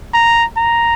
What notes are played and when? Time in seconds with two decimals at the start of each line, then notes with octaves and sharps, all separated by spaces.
0.14 A#5
0.57 A#5